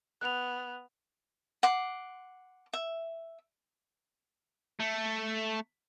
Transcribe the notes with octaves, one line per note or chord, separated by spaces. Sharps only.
B3 F#6 F7
F#5 C6 D6
E5
A3